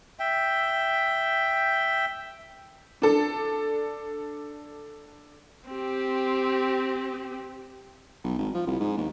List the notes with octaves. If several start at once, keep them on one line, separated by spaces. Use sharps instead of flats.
E5 G5
D4 A4
C4 G4
B1
G#1
F3
C2
G#2
D#2